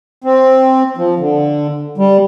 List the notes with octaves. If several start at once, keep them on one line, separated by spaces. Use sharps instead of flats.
C4
F3
D3
G3